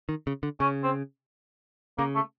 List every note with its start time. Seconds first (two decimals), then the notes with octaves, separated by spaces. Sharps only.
0.09 D#3
0.27 C#3
0.43 D3
0.60 C#3 C#4
0.84 C4
1.98 C#3 A#3
2.15 A3